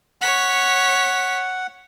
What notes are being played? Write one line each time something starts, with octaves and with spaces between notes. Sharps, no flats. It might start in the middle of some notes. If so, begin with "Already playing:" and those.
C#5 F#5 B6